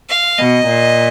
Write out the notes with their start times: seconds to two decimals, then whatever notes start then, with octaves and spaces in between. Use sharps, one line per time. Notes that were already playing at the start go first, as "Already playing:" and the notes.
0.09 F5
0.39 B2 D#5
0.67 A#2